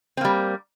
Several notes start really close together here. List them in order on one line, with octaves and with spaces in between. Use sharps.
C4 A#3 G3